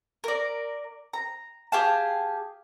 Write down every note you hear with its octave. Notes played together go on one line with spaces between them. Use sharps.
A#4 D5
A#5
G4 G#4 F5 A5